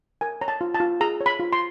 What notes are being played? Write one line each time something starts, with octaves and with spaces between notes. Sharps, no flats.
A#4 G#5
C#5 A#5
A5
F4
A5
F4
G#4 A#5
C#5
B5
F4
C6